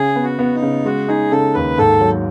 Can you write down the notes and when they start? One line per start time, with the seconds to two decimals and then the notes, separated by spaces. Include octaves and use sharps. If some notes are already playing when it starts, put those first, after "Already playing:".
Already playing: C#3 G#4
0.16 B3
0.23 F#4
0.39 B3
0.55 D#4
0.63 C#3
0.85 G#3 F#4
1.08 D#4 G#4
1.31 C#3 A4
1.54 D#2 B4
1.78 G#2 A4
2.01 F#3